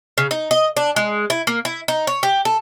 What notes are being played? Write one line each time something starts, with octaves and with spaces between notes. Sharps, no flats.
C#3
D#4
D#5
D4
G#3
E4
A#3
E4
D#4
C#5
G4
A4